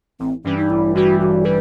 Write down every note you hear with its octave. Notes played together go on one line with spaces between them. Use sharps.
A1 C4
G2 E3 G3 C#4
D#4
A1 E4
G2 E3 G3 F#4
A1 F#4
E3 G3 B4